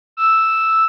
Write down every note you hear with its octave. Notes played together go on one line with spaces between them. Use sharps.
E6